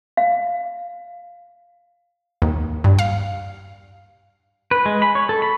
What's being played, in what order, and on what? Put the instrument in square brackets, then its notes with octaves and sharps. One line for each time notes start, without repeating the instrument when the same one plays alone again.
[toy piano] F5
[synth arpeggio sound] D#2
G2
F5
[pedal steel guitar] B4
G#3
B5
C#5
A4
B5